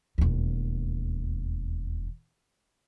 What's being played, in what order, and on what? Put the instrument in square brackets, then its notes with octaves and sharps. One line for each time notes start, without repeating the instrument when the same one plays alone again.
[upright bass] E1 D#2